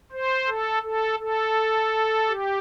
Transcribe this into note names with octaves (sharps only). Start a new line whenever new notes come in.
C5
A4
A4
A4
G4